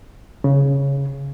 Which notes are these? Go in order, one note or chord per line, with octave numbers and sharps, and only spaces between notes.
C#3